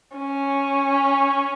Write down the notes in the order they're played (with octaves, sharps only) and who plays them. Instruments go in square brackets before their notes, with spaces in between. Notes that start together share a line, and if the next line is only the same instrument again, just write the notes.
[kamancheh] C#4